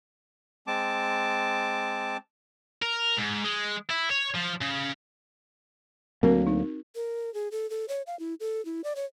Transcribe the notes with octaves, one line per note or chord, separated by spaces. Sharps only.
G#3 C4 A5 D6
A#4
G#2
G#3
E4
C#5
F3
C#3
D2 F#3 A#3 C4 F#4 A#4
D#4
A#4
G#4
A4
A4
C#5
F5
E4
A4
E4
D5
C#5